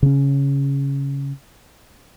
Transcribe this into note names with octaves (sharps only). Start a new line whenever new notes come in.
C#3 C#4